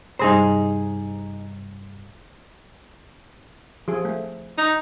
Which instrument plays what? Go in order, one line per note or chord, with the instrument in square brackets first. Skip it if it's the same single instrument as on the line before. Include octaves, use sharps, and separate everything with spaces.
[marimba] G2 C3 G3 [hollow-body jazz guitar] D#4 G#4 C5
[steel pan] F3 G#4
A3
[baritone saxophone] D#4